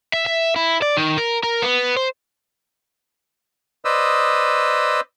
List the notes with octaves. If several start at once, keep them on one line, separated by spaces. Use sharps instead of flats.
E5
E5
E4
D5
D#3
A#4
A#4
B3
C5
B4 C5 D5 D#5 D#6 E6